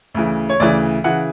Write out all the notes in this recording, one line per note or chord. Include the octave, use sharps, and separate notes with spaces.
D2 C#3 E3
C#5
D2 C#3 E3 D5
C#3 E3 F#5